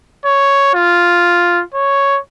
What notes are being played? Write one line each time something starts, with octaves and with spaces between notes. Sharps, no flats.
C#5
F4
C#5